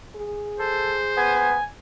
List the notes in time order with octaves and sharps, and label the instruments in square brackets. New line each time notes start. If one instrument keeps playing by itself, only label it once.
[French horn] G#4
[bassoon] A4 [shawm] C5
[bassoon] B3 [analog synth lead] G#5